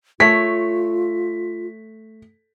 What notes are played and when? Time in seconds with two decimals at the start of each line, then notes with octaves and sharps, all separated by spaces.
0.20 A3 F4 C#5 B6